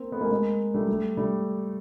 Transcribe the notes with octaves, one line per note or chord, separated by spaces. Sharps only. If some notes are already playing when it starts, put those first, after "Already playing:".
Already playing: A#3 C4
A3 B3
G#3 A#3
G#3 A#3
G3 A3
G3 A3
G3 A3